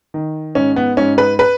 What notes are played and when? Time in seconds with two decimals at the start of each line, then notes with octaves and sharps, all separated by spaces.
0.14 D#3
0.55 G#2 C#4
0.76 B3
0.97 G#2 C#4
1.18 B4
1.39 B4